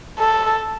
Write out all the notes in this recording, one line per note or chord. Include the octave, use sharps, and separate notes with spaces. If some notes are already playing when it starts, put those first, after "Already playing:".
A4